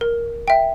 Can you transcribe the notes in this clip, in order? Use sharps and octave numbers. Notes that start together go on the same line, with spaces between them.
A#4
E5 G5